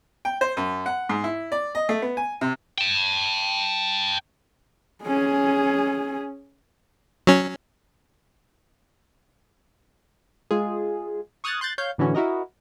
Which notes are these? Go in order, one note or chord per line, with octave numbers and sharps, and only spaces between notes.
G5
C5
F#2
F#5
G#2
E4
D5
D#5
A3
B3
G#5
C3
G5 A5
C#4 G#4
F#3 C#4
G#3 F4 G#4
C#6 D#6 F6 F#6 G#6 A6
C6 F#6 G6 A6
C#5 F5 G6
A2 D3 E3 F#3 C#4 F#4
E4 F#4 A#4 D#5